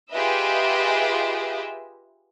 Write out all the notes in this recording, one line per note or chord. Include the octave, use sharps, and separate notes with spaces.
F4 G4 G#4 B4 D#5 E5